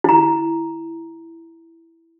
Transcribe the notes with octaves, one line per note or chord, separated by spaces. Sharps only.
E4 A#5